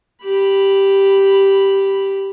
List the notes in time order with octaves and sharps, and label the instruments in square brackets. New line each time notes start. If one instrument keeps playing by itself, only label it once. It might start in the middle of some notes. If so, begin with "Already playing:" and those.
[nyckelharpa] G4 B5